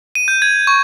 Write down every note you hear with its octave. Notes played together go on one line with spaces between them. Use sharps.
D#7
G6
G#6
C#6